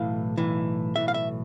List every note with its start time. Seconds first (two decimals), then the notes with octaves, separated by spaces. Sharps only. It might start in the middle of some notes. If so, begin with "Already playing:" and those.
Already playing: B1 A2 E3 F5
0.38 B1 A2 E3
0.95 B1 A2 E3 E5
1.08 F5
1.14 E5